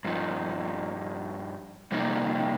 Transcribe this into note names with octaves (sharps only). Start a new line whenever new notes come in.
G2 F3 D#4
F2 C3 G3 A#3 D#4